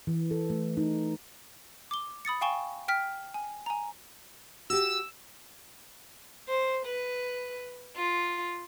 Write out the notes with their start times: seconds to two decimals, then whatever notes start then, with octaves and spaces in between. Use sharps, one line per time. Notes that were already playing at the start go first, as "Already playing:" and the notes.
0.07 E3
0.31 A4
0.50 A3
0.77 D#4
1.91 D6 G7
2.25 B5 D#6 A6 C#7
2.41 F5 G5 G#5 C#6 E7 G7
2.88 G5 F6 B6
3.34 G#5
3.66 G#5 A#5
4.70 F#4 G4 E6
6.48 C5
6.86 B4
7.96 F4